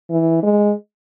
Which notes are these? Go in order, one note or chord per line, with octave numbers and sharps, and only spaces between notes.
E3
G#3